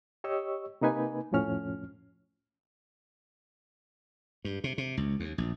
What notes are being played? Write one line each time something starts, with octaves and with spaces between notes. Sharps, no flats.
G4 C#5 D#5 C#6 E6
C3 A#3 D#4 B4 G#5
C2 F2 A2 F3 C#4 F6
G2
C3
C3
C#2
D#2
A#1